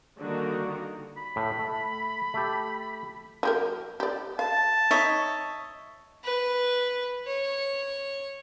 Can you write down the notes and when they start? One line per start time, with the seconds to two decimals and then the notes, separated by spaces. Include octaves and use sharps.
0.18 D3 D#3 G3 A#3 F#4 A#4
1.17 B5
1.36 A2
1.59 A3
2.34 A3 G4
3.43 F#3 G4 A#4
4.00 G4 D5
4.39 F5 A5
4.91 D#4 C#5 D#5 E5
6.24 B4
7.27 C#5